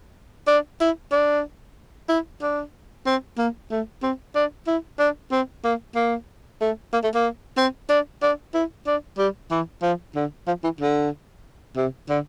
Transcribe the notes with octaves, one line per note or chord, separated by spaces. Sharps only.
D4
E4
D4
E4
D4
C4
A#3
A3
C4
D4
E4
D4
C4
A#3
A#3
A3
A#3
A3
A#3
C4
D4
D4
E4
D4
G3
E3
F3
D3
F3
E3
D3
C3
D3